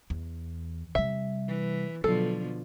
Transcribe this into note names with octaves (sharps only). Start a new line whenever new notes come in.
E2
C3 G3 E5
E3
B2 D3 F3 F#3 A4